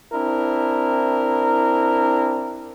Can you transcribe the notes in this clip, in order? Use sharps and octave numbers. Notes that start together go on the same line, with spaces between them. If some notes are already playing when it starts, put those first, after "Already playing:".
C4 D4 E4 A#4